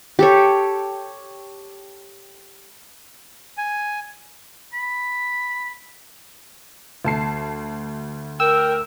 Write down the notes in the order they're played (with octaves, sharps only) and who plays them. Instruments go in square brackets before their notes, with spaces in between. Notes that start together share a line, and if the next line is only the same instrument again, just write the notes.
[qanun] G4 A4 C#5
[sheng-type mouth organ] G#5
[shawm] B5
[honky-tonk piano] D2 A5 C7
[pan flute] A#4 [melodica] G5 [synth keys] E6